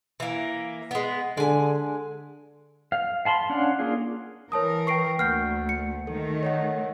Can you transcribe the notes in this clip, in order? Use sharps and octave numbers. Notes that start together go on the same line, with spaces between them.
E3 A#3
G#3 B3
D3 G#3 G#5
F5
F5 A5 B5 C6
C#4 D4 F5 F#5
A#3 D4 F4 G#4 F5
E3 A#4 C#5 A5 D#6
B4 G5 C#6 C7 D7
D2 A3 A#3 F#5 F6 G6 C7
C#7
D#3 A3 A4
C#5 D#5 F#5